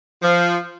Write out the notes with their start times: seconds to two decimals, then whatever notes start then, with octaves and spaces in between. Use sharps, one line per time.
0.23 F3